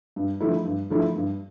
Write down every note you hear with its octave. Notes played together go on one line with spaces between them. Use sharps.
G2
D3 F3 A3 E4
G2
D3 F3 A3 E4
G2